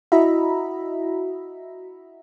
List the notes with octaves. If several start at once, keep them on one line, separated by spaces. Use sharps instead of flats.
E4 F#4 D#5 E5 A#5 B5